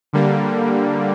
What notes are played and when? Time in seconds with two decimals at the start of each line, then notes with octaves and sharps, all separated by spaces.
0.13 D3 G3 A#3